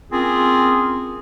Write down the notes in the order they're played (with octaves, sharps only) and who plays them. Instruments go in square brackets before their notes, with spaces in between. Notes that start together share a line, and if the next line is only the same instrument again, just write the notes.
[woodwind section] A#3 C4 C#4 F4 G#4